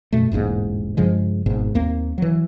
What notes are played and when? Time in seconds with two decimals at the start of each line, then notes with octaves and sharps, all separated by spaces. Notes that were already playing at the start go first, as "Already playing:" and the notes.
0.12 F#2 B2 A3
0.32 E1 A1 G#2 A#3
0.97 G2 C#3 F3 G#3
1.46 G#1 G#2 B2
1.75 D#2 A#3 C4
2.18 E3 F#3